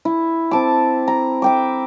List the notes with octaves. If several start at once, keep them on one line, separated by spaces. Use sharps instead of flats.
E4
C4 A5 D6
A#5
E5 G5 D6